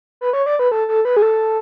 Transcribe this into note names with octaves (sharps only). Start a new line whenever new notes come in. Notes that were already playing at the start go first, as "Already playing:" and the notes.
B4
C#5
D5
B4
A4
A4
B4
G#4
A4